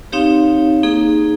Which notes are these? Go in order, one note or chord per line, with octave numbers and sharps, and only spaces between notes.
C4 D#4 G4 C#5 F5
A#3 D#4 G#4